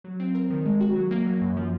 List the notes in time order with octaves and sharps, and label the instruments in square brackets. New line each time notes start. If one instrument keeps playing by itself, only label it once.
[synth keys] F#3
C4
A#4
D#3
G#3
F#4
F#3
A#3
F#3
F#2
F3